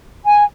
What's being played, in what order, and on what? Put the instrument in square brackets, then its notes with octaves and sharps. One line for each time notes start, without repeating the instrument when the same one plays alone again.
[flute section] G#5